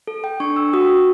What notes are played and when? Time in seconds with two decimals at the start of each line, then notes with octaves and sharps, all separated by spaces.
0.07 A4
0.24 G5
0.40 D4 C#6
0.56 E6
0.73 F#4 D#6